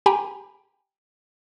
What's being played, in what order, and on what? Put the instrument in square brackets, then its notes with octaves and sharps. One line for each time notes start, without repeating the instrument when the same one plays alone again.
[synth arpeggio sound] G4 G5 G#5 A#5 B5